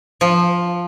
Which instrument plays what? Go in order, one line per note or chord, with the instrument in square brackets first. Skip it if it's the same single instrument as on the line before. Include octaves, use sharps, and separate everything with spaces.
[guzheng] F3